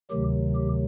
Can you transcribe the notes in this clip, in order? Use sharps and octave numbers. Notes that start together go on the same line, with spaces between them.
D2 C3 D#3 F#3 G4
G4